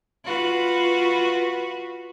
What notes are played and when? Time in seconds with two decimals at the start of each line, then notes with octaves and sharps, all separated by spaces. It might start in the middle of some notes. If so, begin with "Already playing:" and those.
0.24 F4 F#4 B4